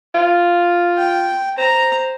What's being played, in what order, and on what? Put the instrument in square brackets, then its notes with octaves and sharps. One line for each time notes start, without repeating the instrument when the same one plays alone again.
[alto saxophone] F4
[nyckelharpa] G5
[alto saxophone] C5 [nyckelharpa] A#5